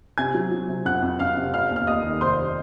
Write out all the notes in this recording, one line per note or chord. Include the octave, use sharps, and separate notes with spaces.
C3 G#5 G#6
F#3
F#3
C3
F2 F#5 F#6
F2
F2 F5 F6
C3
F1 F5 F6
D#2
F6
D#2 D#5 D#6
D#3
F1 C5 C6